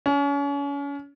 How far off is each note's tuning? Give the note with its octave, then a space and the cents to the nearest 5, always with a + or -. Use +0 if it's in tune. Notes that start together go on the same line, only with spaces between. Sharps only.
C#4 +35